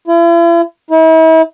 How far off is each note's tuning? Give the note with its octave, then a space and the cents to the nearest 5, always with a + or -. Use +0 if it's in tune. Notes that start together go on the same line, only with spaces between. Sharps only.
E4 +45
E4 -40